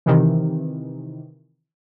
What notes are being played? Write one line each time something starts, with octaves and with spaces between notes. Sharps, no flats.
C3 D#3 E3